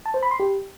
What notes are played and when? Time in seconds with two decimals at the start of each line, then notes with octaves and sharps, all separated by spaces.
0.06 A5
0.14 C5
0.23 B5
0.31 C6
0.40 G4